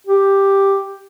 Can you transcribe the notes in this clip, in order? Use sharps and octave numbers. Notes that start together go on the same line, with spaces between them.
G4